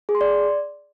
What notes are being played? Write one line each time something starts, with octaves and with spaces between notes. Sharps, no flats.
G#4
C6
D5